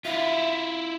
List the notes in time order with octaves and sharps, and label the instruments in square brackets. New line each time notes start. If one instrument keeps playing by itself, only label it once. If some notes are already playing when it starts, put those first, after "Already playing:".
[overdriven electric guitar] E4 F4 [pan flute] E5